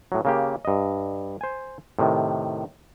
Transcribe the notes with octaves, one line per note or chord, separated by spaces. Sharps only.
A2 F#3
C#3 A#3 G4
G2 D#5
C5 G#5
A2 C3 D#3